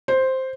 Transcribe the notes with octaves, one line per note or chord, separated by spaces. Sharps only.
C5